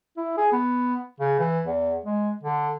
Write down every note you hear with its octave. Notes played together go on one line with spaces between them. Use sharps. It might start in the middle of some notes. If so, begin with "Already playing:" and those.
E4
G#4
B3
C#3
E3
E2
G#3
D3